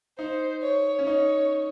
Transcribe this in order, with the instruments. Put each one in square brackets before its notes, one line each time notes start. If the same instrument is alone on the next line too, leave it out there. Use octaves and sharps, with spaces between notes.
[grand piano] D#4 [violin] C5
[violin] C#5
[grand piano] C#4
[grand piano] D#4 [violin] C#5